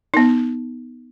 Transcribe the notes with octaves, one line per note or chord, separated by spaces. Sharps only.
B3 D#4